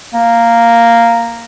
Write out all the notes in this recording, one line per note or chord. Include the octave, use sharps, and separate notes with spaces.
A#3